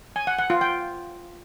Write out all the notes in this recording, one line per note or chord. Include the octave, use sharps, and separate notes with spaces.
G#5
F#5
F#5
F4
G5